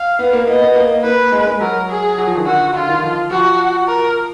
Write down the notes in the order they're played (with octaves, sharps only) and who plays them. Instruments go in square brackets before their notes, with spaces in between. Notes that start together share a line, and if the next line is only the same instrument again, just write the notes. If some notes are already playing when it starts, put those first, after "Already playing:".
Already playing: [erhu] F5
[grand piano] B3
A#3
[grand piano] B3 [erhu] D#5
[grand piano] B3
A#3
[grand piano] A#3 [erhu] B4
[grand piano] G#3
G#3
[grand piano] F#3 [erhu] A#4
[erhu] G#4
[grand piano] F#3
F3
D#3
[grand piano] D3 [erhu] F#4
[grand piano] D3 [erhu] F4
[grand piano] D#3
F3
[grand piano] F3 [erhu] F#4
[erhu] A#4